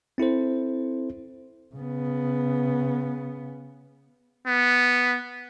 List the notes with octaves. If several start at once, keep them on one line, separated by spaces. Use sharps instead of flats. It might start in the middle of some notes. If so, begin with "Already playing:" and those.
C4 E4 A4 C5
C#3 B3
B3